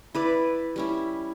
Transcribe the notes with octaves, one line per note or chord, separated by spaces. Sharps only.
E4 B4 D5
G3 C#4 E4